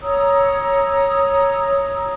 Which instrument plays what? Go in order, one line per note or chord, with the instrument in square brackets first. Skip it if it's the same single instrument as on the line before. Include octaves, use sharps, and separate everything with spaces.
[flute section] C#5 A#5 D#6 E6